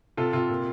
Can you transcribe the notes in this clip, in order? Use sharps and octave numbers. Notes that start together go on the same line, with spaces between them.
C3 F4 A4
C3 F4
A#2